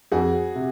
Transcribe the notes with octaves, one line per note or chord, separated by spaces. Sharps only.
F2 F#4 G#4
C3